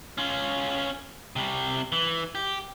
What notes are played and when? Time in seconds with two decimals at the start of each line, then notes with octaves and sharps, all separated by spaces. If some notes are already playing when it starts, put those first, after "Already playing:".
0.18 C#4 F4
1.36 C3 G3
1.92 E3
2.35 G4